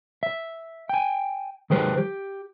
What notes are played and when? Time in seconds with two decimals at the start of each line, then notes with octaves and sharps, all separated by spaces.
0.23 E5
0.89 G5 G#5
1.70 D#3 F#3 G#3 G4 B4 C5
1.98 G4